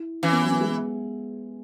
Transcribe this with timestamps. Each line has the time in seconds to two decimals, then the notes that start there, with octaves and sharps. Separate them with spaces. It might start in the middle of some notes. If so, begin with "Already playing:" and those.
Already playing: E4
0.23 E3 C#4
0.32 B3
0.41 F#3
0.51 B3
0.61 G#3
0.70 B3